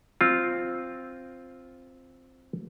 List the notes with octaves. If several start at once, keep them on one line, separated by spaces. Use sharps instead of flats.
C4 F4